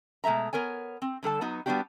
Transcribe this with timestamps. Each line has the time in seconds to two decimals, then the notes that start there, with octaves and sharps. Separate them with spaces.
0.24 B2 G#3 A3 E5 A#5
0.53 B3 A#4 C#5 G#5
1.02 C4
1.23 D3 G3 A4 A5
1.41 F#3 B3 D#4 F#4
1.66 G3 B3 C#4 D4 F#4 G4